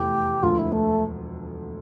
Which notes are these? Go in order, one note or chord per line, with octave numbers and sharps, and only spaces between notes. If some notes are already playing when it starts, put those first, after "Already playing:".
Already playing: F1 E2 E3 A3 G4
E1 D2 D3 F3 A3 F4
E4
A3